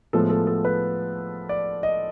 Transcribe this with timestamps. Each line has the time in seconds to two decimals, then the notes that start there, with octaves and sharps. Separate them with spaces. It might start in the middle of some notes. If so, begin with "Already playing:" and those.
0.13 A2 F3 G#3 B3 A4
0.30 A4
0.47 A4
0.65 B4
1.49 D5
1.83 D#5